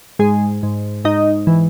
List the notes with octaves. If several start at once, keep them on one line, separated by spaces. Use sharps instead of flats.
G#2 G#3 G#4
G#2
G#2 D#4 D#5
E3